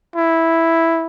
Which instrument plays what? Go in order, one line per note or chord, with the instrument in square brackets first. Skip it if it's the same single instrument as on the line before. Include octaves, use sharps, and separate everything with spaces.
[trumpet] E4